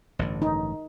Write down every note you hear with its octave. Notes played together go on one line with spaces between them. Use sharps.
A1 G2 D3
D#4